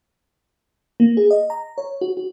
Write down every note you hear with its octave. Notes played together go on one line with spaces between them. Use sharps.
A#3
G#4
D#5
A#5
C#5
F#4
F#4